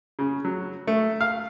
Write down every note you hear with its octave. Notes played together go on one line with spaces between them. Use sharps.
C#3
F#3
A3
F5